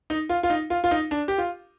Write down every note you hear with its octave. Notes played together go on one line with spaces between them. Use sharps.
D#4
F4
F4
D#4
F4
F4
D#4
D4
G4
F4